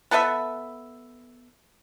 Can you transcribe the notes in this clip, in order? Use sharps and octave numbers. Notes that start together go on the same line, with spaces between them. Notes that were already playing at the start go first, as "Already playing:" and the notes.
B3 A4 B4 E5